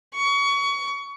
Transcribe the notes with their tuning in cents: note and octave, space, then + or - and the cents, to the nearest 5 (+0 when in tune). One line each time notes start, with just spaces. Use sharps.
C#6 +25